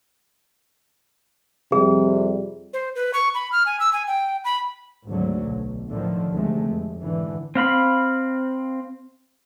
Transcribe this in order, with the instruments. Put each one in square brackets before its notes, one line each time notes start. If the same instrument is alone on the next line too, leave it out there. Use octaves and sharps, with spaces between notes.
[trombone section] F2 G3 [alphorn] C3 [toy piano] G#4
[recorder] C5
B4
C#6
B5
F6
G#5
E6
G#5
G5
B5
[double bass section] G#1 D2 D3 F#3
B1
A2 D3 D#3 F3
D2 C3 G#3 A3
F1
G#1 D3 E3
[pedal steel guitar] C4 F5 B5